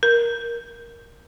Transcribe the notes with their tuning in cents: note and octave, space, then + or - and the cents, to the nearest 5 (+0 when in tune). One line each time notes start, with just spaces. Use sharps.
A#4 +5